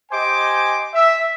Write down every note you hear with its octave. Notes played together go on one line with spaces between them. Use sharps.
G4 C5 D#5 G#5 D6
E5